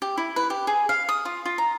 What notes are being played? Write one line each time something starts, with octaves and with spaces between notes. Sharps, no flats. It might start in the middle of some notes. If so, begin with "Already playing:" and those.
G4
E4
B4
G4
G#4
F5
D#6
F4
F4
A#5